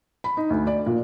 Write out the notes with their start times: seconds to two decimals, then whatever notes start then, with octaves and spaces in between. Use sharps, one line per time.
0.24 B5
0.37 D#4
0.50 D2
0.67 D5
0.86 A#2